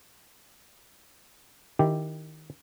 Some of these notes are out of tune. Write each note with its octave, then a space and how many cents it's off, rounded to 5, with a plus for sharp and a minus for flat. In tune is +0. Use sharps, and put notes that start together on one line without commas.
D#3 +0 E4 +20 G4 +0